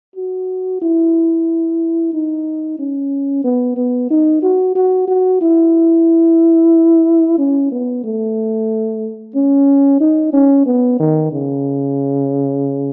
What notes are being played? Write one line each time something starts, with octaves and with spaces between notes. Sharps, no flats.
F#4
E4
D#4
C#4
B3
B3
D#4
F#4
F#4
F#4
E4
C#4
B3
A3
C#4
D#4
C#4
B3
D#3
C#3